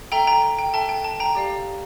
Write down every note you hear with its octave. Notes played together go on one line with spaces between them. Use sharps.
A4 E5 G5 A#5
G5 A#5
G5
A4 E5 G5 A5
G5
A5
G5 A#5
G4 D5 F5